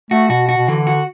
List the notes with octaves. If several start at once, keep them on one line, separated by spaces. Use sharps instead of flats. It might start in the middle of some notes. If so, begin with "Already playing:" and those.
A3 F#4
B2 F#4
F#4
B2
D3 E3
F#4